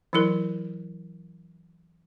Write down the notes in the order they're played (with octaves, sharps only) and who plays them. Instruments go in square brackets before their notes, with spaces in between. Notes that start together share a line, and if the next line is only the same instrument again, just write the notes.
[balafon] E3 F#3 E4 A#4